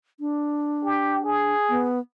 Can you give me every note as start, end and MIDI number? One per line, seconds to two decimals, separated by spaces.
0.20 1.54 62
0.84 1.20 67
1.24 1.89 68
1.69 1.99 59